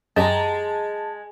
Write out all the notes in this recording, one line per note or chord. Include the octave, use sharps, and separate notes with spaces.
F#2 G#3 G4 D#5 A5 A#5